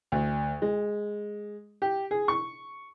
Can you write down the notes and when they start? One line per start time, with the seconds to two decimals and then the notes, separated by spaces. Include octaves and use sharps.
0.12 D2
0.62 G#3
1.82 G4
2.11 G#4
2.28 C#6